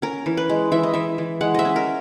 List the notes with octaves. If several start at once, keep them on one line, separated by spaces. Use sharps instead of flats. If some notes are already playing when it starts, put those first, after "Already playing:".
C#4 A#4
E3
B4
G#3
E3 E5
D#5
E3 E5
E3
G#3 F#5
D#5 E5
C#4
A#4